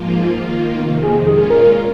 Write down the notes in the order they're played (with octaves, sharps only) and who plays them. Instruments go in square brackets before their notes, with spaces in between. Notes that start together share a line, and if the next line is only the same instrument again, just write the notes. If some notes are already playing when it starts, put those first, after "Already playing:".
Already playing: [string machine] G#2 F3 A#3 F4
D#3 A#3 F4
[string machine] F2 C3 D#3 [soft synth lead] A#3
[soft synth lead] G#4
[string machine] A#2 G#3 C#4 F4 [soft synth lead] G#4
[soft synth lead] A#4